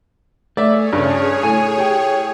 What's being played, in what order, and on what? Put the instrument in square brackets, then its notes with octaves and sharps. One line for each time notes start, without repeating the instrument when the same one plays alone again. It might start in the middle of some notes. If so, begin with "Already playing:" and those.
[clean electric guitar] A3 [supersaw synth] G#4 C#5 [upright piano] D5 E5
[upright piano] G2 C#3 [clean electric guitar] D4
[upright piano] A2 [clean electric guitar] G#5
[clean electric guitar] G4 G5